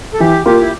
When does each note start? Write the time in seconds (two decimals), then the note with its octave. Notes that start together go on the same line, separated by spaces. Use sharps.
0.14 A4
0.20 E3 G4
0.46 A#3 F4 G4
0.61 E4